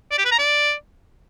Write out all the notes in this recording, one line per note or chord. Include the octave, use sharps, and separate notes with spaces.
D5
G4
B4
A#5
D5